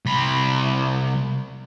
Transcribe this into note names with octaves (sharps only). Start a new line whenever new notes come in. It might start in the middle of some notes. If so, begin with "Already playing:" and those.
C2 B5